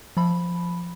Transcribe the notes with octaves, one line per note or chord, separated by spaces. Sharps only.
F3 B5